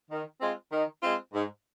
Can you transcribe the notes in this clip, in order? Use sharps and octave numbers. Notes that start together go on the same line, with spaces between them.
D#3
G#3 C4 F4
D#3
G#3 C4 F4
G#2